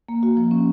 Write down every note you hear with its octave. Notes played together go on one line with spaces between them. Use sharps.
A#3
F#4
F3
C#4